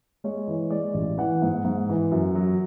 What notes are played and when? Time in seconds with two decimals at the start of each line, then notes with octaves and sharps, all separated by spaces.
0.24 G#3 C#5
0.48 E3
0.70 G#3 D5
0.94 A1
1.18 E3 F#5
1.42 G#2
1.65 G#2
1.89 E3
2.12 F#2
2.35 F#3